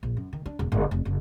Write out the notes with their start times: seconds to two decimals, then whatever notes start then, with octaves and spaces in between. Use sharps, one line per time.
0.03 A#1
0.17 F#2
0.33 D#3
0.46 D4
0.59 E1
0.72 G1
0.91 F1
1.05 F#1